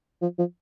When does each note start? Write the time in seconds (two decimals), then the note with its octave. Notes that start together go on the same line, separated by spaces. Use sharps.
0.22 F3
0.39 F3